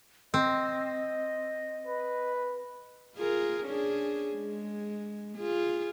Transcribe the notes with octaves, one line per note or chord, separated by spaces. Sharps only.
C4 D#5
B4
F4 G#4 A#4
C#4 D4 G#4
G#3
F4 G#4